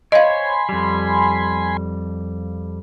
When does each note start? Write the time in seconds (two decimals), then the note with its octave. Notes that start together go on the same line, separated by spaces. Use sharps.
0.12 C5 C#5 D#5 F5 G#5 B5 C6
0.69 F2 G3